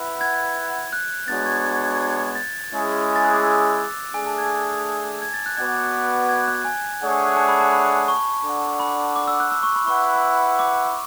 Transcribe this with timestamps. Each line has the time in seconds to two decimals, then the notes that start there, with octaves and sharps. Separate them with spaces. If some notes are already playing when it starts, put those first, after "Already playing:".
Already playing: E4 B4 F#5
0.21 G#6
0.93 F#6
1.28 G#3 B3 D4 F#4 C#5 A6
1.46 G#6
2.35 A6
2.71 G#3 C#4 E4 G#4
3.16 A6
3.25 F#6
3.34 D6
3.43 E6
4.14 A3 D4 G#4 G#5
4.27 A5
4.38 G#6
5.22 G#6
5.34 A6
5.46 F#6
5.58 B3 F#4 B4 D5 F#5 G#6
6.29 G#6
6.48 F#6
6.65 G#5
7.01 A3 D4 G#4 C#5 F#5
7.37 A5
7.48 B5
7.60 A5
7.73 B5
8.08 C#6
8.44 D4 A4 D5 F#5
8.80 B5
9.16 D6
9.28 E6
9.40 F#6
9.51 E6
9.63 C#6
9.76 B5
9.87 E4 B4 F#5 C#6
10.59 D6